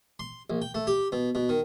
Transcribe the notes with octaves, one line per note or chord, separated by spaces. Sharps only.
C6
A#1
G5
A3
G4
B2
B2
D#3